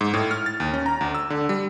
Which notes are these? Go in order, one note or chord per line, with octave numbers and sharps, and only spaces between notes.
G#2
A2
F6
A6
D#2
C#4
A#5
D2
E6
D3
G3